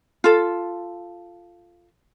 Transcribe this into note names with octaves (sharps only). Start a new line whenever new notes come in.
F4 A4